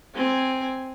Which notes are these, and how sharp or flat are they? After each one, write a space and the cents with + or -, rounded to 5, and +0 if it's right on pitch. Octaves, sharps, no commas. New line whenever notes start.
C4 +0 G#5 +0